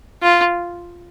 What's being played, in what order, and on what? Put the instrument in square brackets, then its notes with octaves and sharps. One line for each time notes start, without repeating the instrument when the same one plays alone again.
[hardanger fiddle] F4